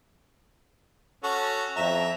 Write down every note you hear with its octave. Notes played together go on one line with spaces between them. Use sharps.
C#4 F#4 A4
F2 E5 A#5